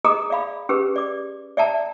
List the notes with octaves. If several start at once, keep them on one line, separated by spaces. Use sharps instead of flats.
G#4 A4 D#5 A#5 D6 D#6
D5 D#5 F5 B5
C#4 G4 G#4 A#4 B4
D5 D6
D5 E5 G5 A5 A#5